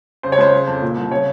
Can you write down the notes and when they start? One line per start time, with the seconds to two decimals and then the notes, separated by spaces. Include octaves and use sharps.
0.23 C#3 C5
0.32 C#5
0.38 C#2 C5
0.53 C#3
0.67 F2
0.82 A#2
0.96 C2
1.11 C#3 C#5